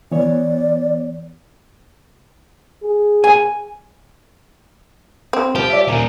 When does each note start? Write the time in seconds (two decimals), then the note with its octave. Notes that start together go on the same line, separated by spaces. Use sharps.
0.12 E3 B3 C#5 D5
2.83 G#4
3.24 G#5
5.33 C4
5.55 F3 G4
5.70 D5 E5
5.88 A#2 D#3 A#4 G#5 A#5